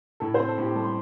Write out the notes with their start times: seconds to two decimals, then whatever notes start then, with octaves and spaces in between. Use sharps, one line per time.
0.20 A2 A4
0.34 C5
0.39 C4
0.48 A4
0.58 A2 G4
0.76 G3 A4
0.84 C6